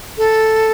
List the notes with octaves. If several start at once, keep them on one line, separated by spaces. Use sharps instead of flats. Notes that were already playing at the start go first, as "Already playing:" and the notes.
A4